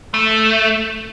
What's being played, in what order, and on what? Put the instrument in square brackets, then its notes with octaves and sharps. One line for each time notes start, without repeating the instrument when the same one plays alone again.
[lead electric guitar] A3